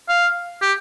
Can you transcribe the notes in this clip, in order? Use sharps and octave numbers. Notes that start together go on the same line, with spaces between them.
F5
G4